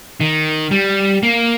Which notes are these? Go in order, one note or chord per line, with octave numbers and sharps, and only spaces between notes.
D#3
G3
A#3